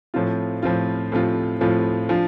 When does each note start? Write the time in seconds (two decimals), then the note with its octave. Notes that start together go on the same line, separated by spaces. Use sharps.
0.14 A2 F3 C4 F4
0.62 A2 F3 C4 F4
1.12 A2 F3 C4 F4
1.61 A2 F3 C4 F4
2.09 F3 D4 F4